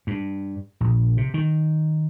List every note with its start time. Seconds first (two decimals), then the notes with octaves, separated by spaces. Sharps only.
0.07 G2
0.80 A#1
1.17 C3
1.34 D#3